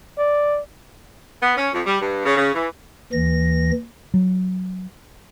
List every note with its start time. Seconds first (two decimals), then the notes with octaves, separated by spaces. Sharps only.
0.18 D5
1.41 B3
1.57 C#4
1.73 F2
1.85 G3
2.00 G2
2.25 C#3
2.36 C#3
2.53 E3
3.13 D#2 E3 A#6
4.14 F#3